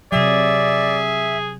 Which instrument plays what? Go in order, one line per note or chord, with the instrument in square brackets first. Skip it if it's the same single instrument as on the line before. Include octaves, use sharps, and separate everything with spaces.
[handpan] C3 F#3 [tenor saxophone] G#4 [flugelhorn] D5 [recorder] E5